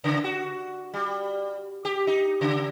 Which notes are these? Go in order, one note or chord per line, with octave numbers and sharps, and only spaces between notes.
C#3
F#4
G3
G4
D#4
C#3